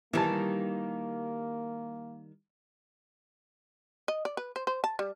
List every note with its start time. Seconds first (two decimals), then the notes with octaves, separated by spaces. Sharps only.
0.13 D#3 E3 G3 A#3 A5
4.08 D#5
4.25 D5
4.37 B4
4.56 C5
4.67 C5
4.84 A5
4.99 G3